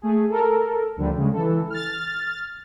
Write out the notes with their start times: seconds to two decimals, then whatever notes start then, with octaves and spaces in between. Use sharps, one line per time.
0.02 A3 G#4
0.29 A4 A#4
0.97 D2 D3 F3 G3
1.16 C#3 G#3
1.33 E3 A4
1.70 F6 A6